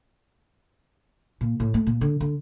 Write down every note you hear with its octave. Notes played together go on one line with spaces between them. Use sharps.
A#2
A2
A3
A#2
D3
D3